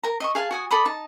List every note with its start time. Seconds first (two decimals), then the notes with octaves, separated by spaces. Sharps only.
0.03 A#4 A#5
0.20 D#5 E5 C#6
0.35 G#4 F5 G#5 A5
0.51 F#4 G#5 D#6
0.71 A4 D5 B5 D#6
0.85 D#4 A5